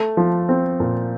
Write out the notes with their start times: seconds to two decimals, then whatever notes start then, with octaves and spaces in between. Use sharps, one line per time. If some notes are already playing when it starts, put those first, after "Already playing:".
Already playing: A3
0.17 F3
0.49 C4
0.80 A#2